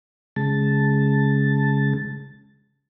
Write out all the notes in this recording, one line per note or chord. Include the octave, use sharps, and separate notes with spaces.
C#3 G#3 A5